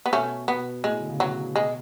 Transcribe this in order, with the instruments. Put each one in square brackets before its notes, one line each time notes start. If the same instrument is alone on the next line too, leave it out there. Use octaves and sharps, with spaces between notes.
[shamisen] B3
[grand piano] B2 [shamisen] A3 C#4
[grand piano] B2 [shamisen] B3
[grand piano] A2 [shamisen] G#3
[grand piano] D3
C#3
[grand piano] B2 [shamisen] F#3
[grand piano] B2 [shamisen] G#3